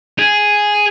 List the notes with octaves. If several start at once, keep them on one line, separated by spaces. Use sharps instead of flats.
G#4